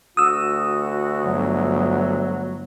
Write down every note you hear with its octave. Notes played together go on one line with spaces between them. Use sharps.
D2 F#4 D#6 E6
G1 F#3